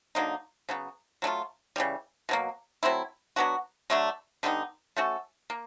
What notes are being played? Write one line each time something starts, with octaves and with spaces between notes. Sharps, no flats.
D3 F#3 A#3 D#4
C#3 F#3 B3
F#3 A3 D4 F4
C#3 E3 G3
B2 F#3 A#3
F#3 A3 C4 E4
F#3 B3 D4 F#4
D3 F#3 A3 D4
D3 G3 B3 D#4
A3 C#4 F#4 A4
A#3